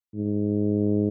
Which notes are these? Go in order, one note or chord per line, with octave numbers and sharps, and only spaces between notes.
G#2